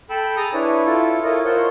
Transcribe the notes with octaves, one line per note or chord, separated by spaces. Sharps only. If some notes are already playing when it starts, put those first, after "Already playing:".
A4 G5 B5 E6
G#4 A5 A#5 D#6
D4 E4 B4 C#5
E4 F4 A4
E4 F4 A4 A#4 C#5 D#5
F4 A#4 C5 C#5 F#5